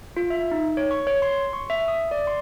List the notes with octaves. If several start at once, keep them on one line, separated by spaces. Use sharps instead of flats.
F4
E5
D#4
C#5
C#6
C#5
C6
C#6
E5
D#6
D5
C6